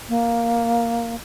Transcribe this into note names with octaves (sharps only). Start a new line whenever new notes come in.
A#3